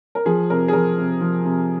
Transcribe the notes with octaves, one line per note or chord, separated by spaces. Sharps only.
A#4
F3 G#4
C3 A#4
G#4
F3 A#4
C3
F3
C3